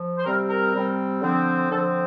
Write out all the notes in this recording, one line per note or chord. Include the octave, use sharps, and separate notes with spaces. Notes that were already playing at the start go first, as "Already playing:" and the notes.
Already playing: F3
C5
C3 G3 C4 A#4
A#4
C3 G3 C4
D3 F3 C4
D3 F3 C4 A4